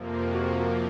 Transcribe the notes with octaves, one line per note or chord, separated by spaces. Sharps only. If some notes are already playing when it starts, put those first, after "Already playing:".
Already playing: F2 C3 F3 A#3
F#4